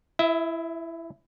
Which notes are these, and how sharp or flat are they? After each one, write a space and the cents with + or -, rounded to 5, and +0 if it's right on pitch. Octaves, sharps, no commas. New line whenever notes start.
E4 +15 E5 -30